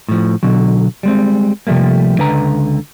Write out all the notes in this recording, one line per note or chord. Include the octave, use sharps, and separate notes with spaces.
A2 F3
B2 D3 F#3
G3 G#3 C4
C3 F3 G3 A3 A#3
C#2 D3 B4 A#5